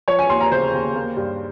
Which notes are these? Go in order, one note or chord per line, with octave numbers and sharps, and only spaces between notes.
F3 C#5
G#5
D#2 C6
A#5
C#3 C5
D#2
A#3
G2